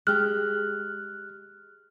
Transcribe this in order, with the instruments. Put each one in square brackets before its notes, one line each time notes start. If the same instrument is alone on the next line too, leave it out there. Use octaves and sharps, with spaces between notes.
[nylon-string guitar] G#3 G4 [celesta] F6 [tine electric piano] F#6